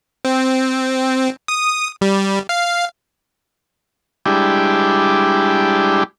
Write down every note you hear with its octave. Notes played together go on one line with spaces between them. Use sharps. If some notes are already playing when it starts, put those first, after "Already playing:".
C4
D#6
G3
F5
G3 G#3 D4 E4 G4